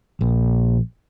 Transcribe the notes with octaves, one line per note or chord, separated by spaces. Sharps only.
A#1